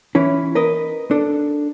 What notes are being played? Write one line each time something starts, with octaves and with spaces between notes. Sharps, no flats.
E3 C#4 E4
A#4 B4 D#5
D4 A4